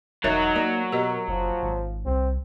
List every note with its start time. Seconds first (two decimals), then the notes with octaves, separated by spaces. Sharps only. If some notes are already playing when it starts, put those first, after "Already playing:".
0.24 E1 F#3 D#4 A#4 C#5 E5
0.56 A#3 D5
0.92 B2 G4 A#4 D#5
1.28 F#1 F3
1.63 G#1
2.05 C2 C4